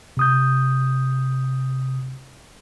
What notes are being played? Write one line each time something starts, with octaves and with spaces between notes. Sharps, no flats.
C3 D#6 G6